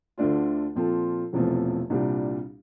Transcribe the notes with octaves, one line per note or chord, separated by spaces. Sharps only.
D2 D3 A3 D4 F4
A#2 F3 C4 F4 A4
E1 E2 C3 F3 A3
C2 A#2 G3 D4